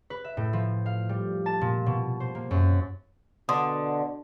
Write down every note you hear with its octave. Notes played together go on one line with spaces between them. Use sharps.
B4
E5
A2
F3
F5
G3
A5
A#2
B2
C5
A#3
F#2
B2 D3 C6 D#6